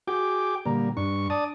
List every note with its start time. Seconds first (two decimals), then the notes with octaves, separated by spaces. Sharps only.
0.08 F#4 G#4 G5 D6
0.66 A#2 D3 G3 A#3 A#5
0.97 G2 D4 C#6
1.30 D5 A5 D#6